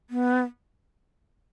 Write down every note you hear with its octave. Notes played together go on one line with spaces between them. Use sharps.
B3